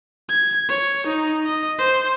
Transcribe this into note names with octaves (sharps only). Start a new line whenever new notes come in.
G#6
C#5
D#4
D#5
C5